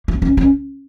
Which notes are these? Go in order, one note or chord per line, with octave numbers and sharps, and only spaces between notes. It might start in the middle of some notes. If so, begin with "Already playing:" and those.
A#3
C#4
C#4